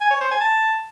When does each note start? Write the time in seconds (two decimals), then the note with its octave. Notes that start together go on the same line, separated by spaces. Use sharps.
0.01 G#5
0.11 C#5
0.21 C5
0.31 G#5
0.41 A5